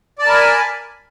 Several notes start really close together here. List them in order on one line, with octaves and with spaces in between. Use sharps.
D5 A5 A#4 B5 G#5